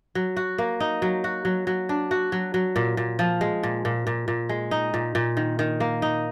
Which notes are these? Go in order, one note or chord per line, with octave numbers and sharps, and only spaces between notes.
F#3
F#4
A#3
D#4
F#3
F#4
F#3
F#3
D4
F#4
F#3
F#3
A#2
A#2
F3
G#3
A#2
A#2
A#2
A#2
G#3
D#4
A#2
A#2
D#3
D#3
A#3
D#4